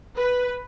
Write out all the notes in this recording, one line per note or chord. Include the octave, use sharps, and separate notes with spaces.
B4